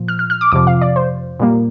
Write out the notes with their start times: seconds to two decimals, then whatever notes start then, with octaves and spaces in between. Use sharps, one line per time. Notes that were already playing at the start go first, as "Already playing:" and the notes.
Already playing: A#2 F3
0.08 F6
0.19 F6
0.30 F6
0.41 D6
0.52 F2 C3 F3 D6
0.67 F5
0.81 D5
0.96 C5
1.40 A#2 G3 A#3